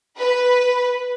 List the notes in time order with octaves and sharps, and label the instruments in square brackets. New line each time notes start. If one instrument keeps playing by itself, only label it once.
[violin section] B4